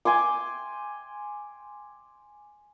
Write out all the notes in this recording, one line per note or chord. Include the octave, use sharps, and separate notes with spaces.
G5 G#5 C6 D6